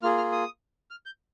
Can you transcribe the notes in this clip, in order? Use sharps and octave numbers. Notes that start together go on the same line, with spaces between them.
A#3 F4 G#4 F6
F6
D#6
F6
G6